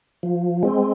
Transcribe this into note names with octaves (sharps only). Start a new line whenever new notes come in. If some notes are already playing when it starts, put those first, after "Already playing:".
F3
G#3 C4